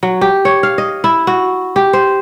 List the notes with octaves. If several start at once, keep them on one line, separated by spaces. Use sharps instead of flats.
F#3
G4
C#5
F5
D#5
E4
F#4
G4
C5